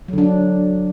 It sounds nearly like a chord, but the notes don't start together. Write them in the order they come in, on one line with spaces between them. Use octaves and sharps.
F#3 D3 D4